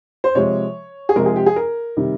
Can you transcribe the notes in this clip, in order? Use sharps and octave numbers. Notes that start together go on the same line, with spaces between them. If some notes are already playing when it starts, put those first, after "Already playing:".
C5
C3 F3 G#3 C#5
G#4
C3 F3 G#3 A#4
G#4
G4
G#4
A#4
C3 D#3 G3